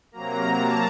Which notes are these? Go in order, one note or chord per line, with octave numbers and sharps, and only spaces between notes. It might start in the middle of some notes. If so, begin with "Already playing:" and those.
C3 F#3 A#3 A#5
A5